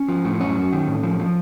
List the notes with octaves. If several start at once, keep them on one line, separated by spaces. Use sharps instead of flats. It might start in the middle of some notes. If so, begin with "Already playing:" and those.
Already playing: C#4
F3
A2
F#2 C#4 C#5
F#2
D#3
A2
F3
F3